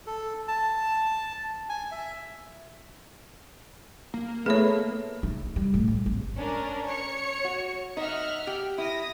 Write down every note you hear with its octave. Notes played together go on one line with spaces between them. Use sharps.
A4
A5
G#5
E5
A#3
A3 B3 E4 G#4 B4 C#5
D#4
G3
A2
G2
G#1
C#4 D4 A#4
C#5 C#7
F#4
D#4 E5 F#5 F6
G4
E4 D#6 A#6